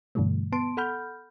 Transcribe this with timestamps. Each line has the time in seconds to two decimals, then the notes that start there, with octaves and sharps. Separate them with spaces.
0.15 G2 B2 D3 E3 G3 A3
0.52 B3 A5 C6 D7
0.77 A4 F#5 B5 F6 G6